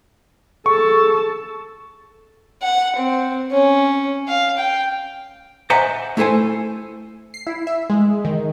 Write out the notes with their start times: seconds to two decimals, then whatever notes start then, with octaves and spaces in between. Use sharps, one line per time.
0.66 G#4 A4 A5 C#6
2.63 F#5
2.96 C4
3.52 C#4
4.28 F5
4.57 G5
5.70 C5 D#5 E5 F#5 G#5 A#5
6.17 A3 E4 A4 C5 G#5
7.34 C7
7.47 E4
7.67 E5
7.90 G#3
8.25 D#3